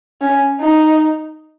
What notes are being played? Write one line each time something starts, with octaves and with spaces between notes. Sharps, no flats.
C#4
D#4